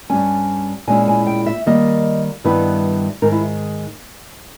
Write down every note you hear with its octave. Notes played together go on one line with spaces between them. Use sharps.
G2 G3 C#4 G#5
A#2 G#3 C#4 E4 G#5
G#5
G5
E5
D#3 G3 A#3 D#5
G2 D#3 G3 B3 E4 B4
G#2 D#3 G#3 D#4 A#4
E4